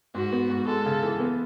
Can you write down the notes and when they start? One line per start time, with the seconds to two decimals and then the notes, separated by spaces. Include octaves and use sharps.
0.15 G#2 F#4
0.32 B3
0.50 G#2
0.67 G#3 A4
0.86 C#3
1.03 E3
1.20 B3